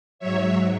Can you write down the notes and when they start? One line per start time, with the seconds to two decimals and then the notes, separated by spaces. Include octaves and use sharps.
0.19 G#2 F#3 C#5 E5